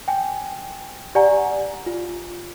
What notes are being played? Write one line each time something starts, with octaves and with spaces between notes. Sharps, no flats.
G5 G#5
G4 D5 F#5 G#5 A#5
F4